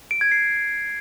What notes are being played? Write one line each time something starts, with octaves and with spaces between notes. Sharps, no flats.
D7
G#6
C7